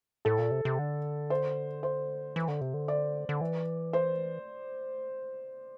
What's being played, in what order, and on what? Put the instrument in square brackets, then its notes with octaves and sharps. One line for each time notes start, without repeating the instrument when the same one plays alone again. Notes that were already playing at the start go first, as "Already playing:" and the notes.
[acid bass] A2 [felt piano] A4
[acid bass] A#2
C3
C3
D3
[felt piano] C5
C5
[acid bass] E3
D3
C3
D3
[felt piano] D5
[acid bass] D3
E3
[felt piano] C5